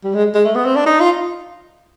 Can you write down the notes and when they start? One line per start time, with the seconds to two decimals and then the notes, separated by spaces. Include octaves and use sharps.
0.04 G3
0.14 G#3
0.35 G#3
0.45 A3
0.55 B3
0.65 C4
0.76 D4
0.86 D#4
1.00 F4